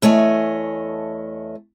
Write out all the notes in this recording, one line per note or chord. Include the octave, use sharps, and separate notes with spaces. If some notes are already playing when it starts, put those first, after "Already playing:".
E2 A3 C#5 D#5 G#5